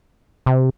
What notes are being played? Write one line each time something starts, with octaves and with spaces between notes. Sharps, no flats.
C3